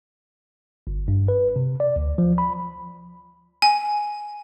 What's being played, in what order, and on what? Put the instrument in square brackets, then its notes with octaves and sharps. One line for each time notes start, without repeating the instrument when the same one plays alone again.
[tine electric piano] G1
G2
B4
C3
D5
D2
F3
B5
[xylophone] G#5